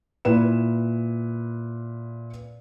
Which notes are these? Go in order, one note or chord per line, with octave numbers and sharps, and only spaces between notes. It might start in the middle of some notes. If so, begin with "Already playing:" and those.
A#2 E4 B4 E7